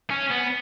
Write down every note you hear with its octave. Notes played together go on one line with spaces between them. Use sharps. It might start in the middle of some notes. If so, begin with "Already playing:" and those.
C#4
B3